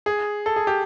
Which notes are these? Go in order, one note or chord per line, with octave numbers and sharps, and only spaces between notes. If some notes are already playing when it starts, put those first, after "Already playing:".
G#4
A4
G#4
G4